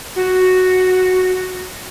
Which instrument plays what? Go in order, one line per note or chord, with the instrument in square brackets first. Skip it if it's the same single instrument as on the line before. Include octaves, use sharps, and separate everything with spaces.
[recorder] F#4